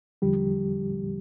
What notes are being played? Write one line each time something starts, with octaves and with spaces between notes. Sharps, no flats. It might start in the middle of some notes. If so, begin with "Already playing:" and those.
E2 D3 F3 G3 G4